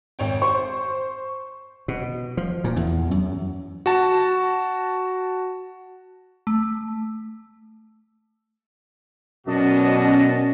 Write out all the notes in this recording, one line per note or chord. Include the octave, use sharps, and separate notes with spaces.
G#1 C#5 G5
C5 C#6
B2
F3
A#2
E2
F#2
F#4 A5
A3
F#2 B2 C#4 D4 F#4 D#5